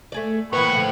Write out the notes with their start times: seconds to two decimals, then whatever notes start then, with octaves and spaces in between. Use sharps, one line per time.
0.12 A3 G#4 D5
0.53 A2 E3 A#3 B4 F#5 B5 C#6
0.72 D3 F3